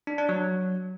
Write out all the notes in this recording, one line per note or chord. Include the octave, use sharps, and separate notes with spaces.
D4
D4
F#3